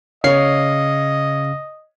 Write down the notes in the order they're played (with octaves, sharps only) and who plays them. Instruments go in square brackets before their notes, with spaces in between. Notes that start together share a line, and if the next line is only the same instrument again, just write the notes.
[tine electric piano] C#3 F5 C7 [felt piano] C#5 [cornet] D#5